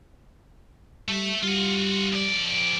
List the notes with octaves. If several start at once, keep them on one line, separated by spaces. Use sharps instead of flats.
G3 A3 E5
G3 F4 F#4
F2 D5